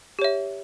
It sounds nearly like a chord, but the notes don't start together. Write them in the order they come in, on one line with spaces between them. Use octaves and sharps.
G4 C#5 E5